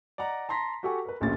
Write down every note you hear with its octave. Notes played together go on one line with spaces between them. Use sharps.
D5 D#5 F#5 A#5
A5 A#5 C6 A#6 B6
F#4 G4 A4 F#5 G#5 C#6
A#4 B4
D1 A#1 A#2 C#4 A6